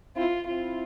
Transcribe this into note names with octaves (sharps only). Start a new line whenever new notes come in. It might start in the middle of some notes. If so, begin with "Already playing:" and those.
C4 E4 F4
C4 E4 F4